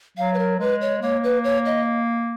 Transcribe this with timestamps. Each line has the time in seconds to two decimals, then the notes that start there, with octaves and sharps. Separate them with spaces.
0.17 F#3 F5
0.34 B4
0.39 A#4
0.59 G#3 B4
0.81 C#5
1.02 A#3 C#5
1.24 B4
1.44 C#5
1.65 D#5